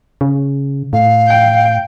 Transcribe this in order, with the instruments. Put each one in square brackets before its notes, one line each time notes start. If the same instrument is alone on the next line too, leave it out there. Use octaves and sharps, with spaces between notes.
[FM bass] C#3
[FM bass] A2 [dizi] F5
[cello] G5